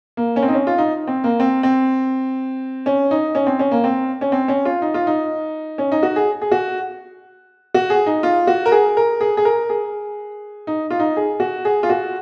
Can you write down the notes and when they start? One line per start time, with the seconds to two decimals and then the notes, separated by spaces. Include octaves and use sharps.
0.17 A#3
0.36 C#4
0.42 C4
0.48 D#4
0.53 C#4
0.67 F4
0.78 D#4
1.07 C4
1.24 A#3
1.40 C4
1.63 C4
2.86 C#4
3.11 D#4
3.35 C#4
3.47 C4
3.59 C#4
3.71 A#3
3.84 C4
4.21 C#4
4.32 C4
4.48 C#4
4.65 F4
4.82 D#4
4.94 F4
5.07 D#4
5.78 C#4
5.92 D#4
6.03 F#4
6.16 G#4
6.41 G#4
6.52 F#4
7.74 F#4
7.90 G#4
8.06 D#4
8.23 F4
8.47 F#4
8.66 A#4
8.72 G#4
8.97 A#4
9.21 G#4
9.37 G#4
9.45 A#4
9.69 G#4
10.67 D#4
10.90 F4
11.00 D#4
11.17 G#4
11.40 F#4
11.65 G#4
11.83 F4
11.90 F#4